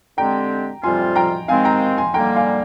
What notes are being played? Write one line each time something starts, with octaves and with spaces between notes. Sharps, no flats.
D3 G#3 C4 G4 G5 A#5
F2 C3 G3 C4 F4 G#5 C6
G5 A#5
C3 D#3 G#3 C4 F5 G#5
G5 A#5
G#5 C6
D3 G3 A#3 G5 A#5
F5 G#5